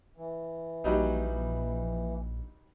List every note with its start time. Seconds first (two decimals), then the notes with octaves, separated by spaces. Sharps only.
0.17 E3
0.84 A#1 F#3 G3 D#4